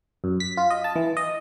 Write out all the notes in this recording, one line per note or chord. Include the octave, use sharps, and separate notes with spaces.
F#2
B6
F4
D#5
A5
E3
D#5